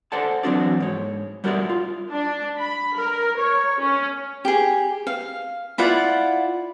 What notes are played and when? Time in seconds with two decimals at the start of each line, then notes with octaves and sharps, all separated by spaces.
0.12 A4 C5 D5 F#5 G#5 A5
0.43 E3 F#3 C4 D4 F#4 D5
0.80 G#2 C#5
1.44 G3 F#4 A#4 C#5 D5 E5
1.70 F4
2.11 D4
2.58 B5
2.96 A#4
3.38 C#5
3.80 C#4
4.45 G4 G#4
5.07 F5
5.78 E4 F4 D5 F#5